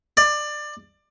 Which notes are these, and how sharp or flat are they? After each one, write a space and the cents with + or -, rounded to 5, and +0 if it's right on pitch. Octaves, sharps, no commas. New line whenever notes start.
D5 +25